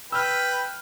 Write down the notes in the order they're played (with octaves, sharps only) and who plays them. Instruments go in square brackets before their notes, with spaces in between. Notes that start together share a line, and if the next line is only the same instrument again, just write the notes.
[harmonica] B4 G5 B5 [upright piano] E6 F6